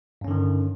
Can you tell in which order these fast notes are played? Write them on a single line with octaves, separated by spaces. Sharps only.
G2 C#4 D3 D#3